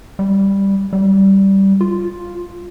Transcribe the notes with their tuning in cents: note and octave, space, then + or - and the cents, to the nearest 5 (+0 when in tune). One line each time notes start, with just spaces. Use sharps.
G3 +5
G3 -10
F4 +5